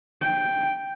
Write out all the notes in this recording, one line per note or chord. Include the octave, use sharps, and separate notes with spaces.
G5